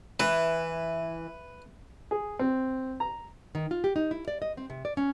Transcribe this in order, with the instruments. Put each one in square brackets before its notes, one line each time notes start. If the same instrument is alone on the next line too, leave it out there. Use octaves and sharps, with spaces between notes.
[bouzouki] E3 [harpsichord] B4
[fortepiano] G#4
C4
A#5
[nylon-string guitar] D#3
F4
G4
D#4
E4
D5
D#5
C4
C3
D5
C#4